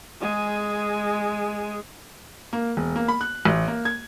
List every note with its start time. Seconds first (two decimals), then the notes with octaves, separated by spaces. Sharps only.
0.21 G#3 G#4
2.53 A#3
2.77 E1
2.96 A#3
3.08 B5
3.21 F#6
3.45 A1
3.68 A#3
3.85 G#6